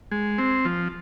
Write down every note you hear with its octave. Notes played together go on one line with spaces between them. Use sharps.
G#3
C4
F3